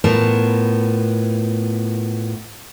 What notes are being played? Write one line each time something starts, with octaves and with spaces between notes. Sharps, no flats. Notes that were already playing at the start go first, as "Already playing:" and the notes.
A2 B3 F4 A#4 A5